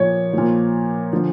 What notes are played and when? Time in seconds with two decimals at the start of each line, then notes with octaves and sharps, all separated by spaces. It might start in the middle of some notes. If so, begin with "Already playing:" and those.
Already playing: A#2 F3 C#5
0.33 A#2 F3
1.13 D3 F3